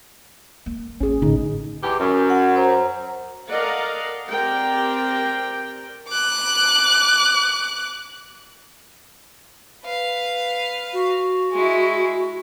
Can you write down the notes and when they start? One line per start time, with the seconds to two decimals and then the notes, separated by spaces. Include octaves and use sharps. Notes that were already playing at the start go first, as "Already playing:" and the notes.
0.66 A#3
1.01 A1 C#4 G#4
1.22 A2 D3 D#4
1.83 E2 E3 G4
1.99 F#2
2.30 F#5
2.56 C5 A#5
3.49 A4 A#4 D5 D#5 F5 F#5
4.29 C4 G4 A#4 D5 G5
6.08 D6 F#6
9.83 B4 F5
10.93 F#4
11.52 G#3 E4